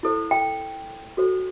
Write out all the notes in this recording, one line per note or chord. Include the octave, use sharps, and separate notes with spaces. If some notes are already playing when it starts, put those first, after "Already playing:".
E4 A4 C5
G5
F#4 A4 C5